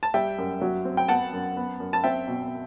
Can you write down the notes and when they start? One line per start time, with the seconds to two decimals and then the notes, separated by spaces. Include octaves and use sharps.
0.03 A5
0.14 G3 E5 G5
0.38 F#2
0.61 F#3
0.85 C4
0.97 G5
1.08 B3 F#5 A5
1.33 F#2
1.57 B3
1.80 F#2
1.93 A5
2.04 C4 E5 G5
2.28 B2